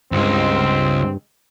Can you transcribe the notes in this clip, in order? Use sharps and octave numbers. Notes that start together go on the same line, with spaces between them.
C#2 G2 G#3 C4